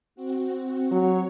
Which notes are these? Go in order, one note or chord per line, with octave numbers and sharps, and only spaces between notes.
C4 F#4
F#3 C#5